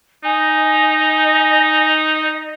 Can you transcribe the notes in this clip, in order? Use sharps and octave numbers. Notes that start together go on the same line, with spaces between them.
D#4 D#5 G#5